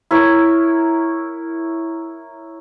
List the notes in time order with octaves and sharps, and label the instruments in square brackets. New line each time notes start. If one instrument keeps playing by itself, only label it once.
[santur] E4 A#4 C#5